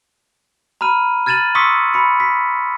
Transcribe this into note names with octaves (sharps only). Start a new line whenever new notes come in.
A#5 B5 F6 D#7
F6 G#6 A6 D#7 E7 F#7
C6 C#6 D#6 E6 B6 C#7
B5 C#7
B6